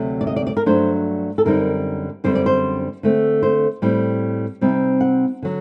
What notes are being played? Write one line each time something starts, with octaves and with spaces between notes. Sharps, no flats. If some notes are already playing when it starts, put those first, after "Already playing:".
Already playing: D2 C3 F#3 A3
D5
D#5
D5
D5
A#4
G2 F#3 A3 D4 C5
A4
F#2 D3 G3 C4 D#4 A#4
F#2 D3 G3 C4 C5
D5
C5
D3 A3 C4
C5
A2 G3 C4
C3 G3 C4 D#4
F#5
D3 F#3